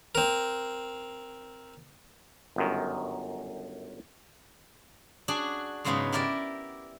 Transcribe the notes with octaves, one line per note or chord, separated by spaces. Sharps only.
C4 A#4
G1 F#2 D#3
D4 F#4 G#4
G#2 C#3 F#3 G#3 B3 D#4
E4 G4 A#4 D5 E5